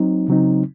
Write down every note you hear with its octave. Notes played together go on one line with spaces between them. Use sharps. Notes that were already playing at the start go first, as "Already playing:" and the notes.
Already playing: F#3 C4 D#4
C#3 F#3 C4 D#4